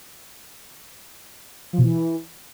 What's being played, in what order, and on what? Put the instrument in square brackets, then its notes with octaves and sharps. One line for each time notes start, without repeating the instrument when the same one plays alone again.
[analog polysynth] F3
B2
E3